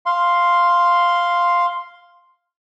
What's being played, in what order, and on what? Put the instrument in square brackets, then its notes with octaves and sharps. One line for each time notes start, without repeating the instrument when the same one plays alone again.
[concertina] F5 C6